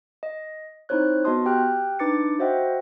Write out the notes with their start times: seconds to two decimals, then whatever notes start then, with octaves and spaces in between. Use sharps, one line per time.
0.23 D#5
0.89 C4 D#4 E4 C5 C#5 F#6
1.24 B3 F#4 D#5 A5 C6 D#6
1.45 G4 G5 F6 F#6
1.99 D4 D#4 B4 D6 A6 C#7
2.39 F#4 C5 D#5 E5 F#5 G5